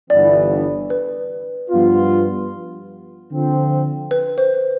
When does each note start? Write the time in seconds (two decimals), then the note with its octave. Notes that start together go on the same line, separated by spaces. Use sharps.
0.10 G1 G2 E3 B3 D5
0.90 B4
1.71 G2 F3 B3 F4
3.31 D3 F3 C4
4.11 B4
4.38 C5